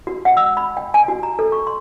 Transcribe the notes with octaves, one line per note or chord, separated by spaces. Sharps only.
F#4
F#5
E6
B5
G5
G#5
F#4
A#5
A4
C#6
C6